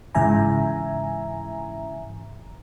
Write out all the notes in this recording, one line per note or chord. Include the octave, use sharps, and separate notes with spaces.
G#2 C#3 E3 E5 G#5 A#5